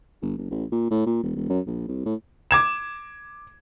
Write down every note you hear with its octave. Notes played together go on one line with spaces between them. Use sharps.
G1
F#1
A1
A#2
A2
A#2
E1
E1
F#2
A#1
C2
A2
D6 G#6 E7